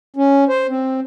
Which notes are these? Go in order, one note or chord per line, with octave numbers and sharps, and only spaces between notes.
C#4
C5
C4